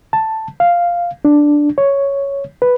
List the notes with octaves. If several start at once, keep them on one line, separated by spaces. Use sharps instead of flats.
A5
F5
D4
C#5
B4